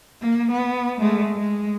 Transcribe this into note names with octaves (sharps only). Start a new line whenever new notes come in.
A#3
B3
G#3 A3
G#3